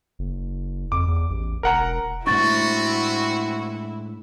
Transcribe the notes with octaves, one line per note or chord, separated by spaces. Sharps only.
F#1
F2 D6
E2
A1
E1 A#4 F#5 A#5
A2 G#3 C4 D4 E4 F#4 C#6 A6